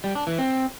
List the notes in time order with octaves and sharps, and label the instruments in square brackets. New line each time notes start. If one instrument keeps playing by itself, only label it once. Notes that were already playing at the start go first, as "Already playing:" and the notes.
[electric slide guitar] G3
D4
E3
C4